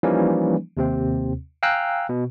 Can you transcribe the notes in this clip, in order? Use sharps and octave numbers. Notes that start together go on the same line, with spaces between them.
E3 F3 G3 A#3 C#4 D#4
D#2 C3 C4
F5 G5 G#5 A#5 E6 F#6
B2